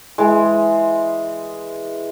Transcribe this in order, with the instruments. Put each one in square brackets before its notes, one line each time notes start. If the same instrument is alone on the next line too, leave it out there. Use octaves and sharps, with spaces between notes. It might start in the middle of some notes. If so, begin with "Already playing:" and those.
[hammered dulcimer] E3 G#3